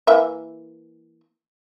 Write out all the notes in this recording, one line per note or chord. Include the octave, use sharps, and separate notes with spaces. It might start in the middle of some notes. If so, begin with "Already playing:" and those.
E3 A#3 E5